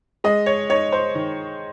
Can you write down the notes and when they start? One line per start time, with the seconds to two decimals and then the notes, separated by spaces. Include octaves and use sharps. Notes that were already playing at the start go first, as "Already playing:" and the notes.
0.24 G#3 D#5
0.46 C#5
0.69 D#4 C#5
0.92 C5
1.15 D#3